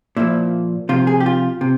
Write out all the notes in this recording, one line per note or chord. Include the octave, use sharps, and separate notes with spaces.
A#2 F3 E4
C3 F3 F4
G#4
G4
F4
C3